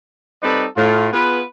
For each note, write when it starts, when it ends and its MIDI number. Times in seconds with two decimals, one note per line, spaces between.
0.42 0.66 55
0.42 0.66 60
0.42 0.66 63
0.42 0.66 69
0.42 0.66 71
0.42 0.66 74
0.77 1.08 45
0.77 1.08 65
1.13 1.41 59
1.13 1.41 65
1.13 1.41 68
1.13 1.41 71